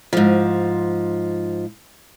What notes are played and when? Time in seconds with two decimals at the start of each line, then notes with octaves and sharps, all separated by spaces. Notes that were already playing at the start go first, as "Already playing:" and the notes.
0.13 G#2 F3